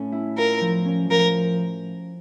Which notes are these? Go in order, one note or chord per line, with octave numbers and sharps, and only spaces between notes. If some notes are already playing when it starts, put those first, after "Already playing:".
Already playing: A2 C#4
E4
F4 A#4
F3
C#4
F3 A#4